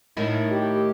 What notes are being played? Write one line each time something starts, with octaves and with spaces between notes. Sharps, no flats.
A2 D#3 E4
G4